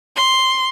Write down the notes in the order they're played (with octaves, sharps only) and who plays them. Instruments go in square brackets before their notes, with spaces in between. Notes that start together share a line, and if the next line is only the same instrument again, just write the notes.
[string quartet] C6